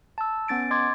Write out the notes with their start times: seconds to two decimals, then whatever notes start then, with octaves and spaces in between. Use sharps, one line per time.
0.18 A5 E6
0.48 B3 C#4 A6 D7
0.71 D#5 C6 D6 G#6 A6